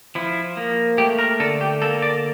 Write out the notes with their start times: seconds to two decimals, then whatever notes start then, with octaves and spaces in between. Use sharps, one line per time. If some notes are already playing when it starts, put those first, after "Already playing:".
0.15 F3 E4
0.57 A#3
0.98 A3 G4
1.19 A#4
1.40 D3 A4
1.61 G4
1.82 A#3 A4
2.02 D5